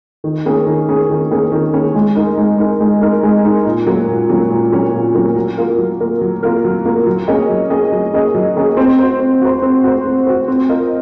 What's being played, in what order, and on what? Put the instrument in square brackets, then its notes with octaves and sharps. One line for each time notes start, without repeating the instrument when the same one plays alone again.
[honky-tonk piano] D#3
A#3 C#4 G#4
D#3
A#3 C#4 G#4
D#3
A#3 C#4 G#4
D#3
A#3 C#4 G#4
G#3
D#4 A#4
G#3
D#4 A#4
G#3
D#4 A#4
G#3
D#4 A#4
A#2
F#3 A#3 C#4
A#2
F#3 A#3 C#4
A#2
F#3 A#3 C#4
A#2
F#3 A#3 C#4
F#3
A#3 F4 A#4
F#3
A#3 F4 A#4
F#3
A#3 F4 A#4
F#3
A#3 F4 A#4
F#3
A#3 C#4 G#4 D#5
F#3
A#3 C#4 G#4 D#5
F#3
A#3 C#4 G#4 D#5
F#3
A#3 C#4 G#4 D#5
C4
F#4 C5
C4
F#4 C5
C4
F#4 C5
C4
F#4 C5
C4
F4 A#4 D#5